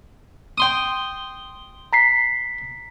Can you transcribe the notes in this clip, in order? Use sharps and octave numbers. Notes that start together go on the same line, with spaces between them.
G5 C6 D#6
A#5 B6 C7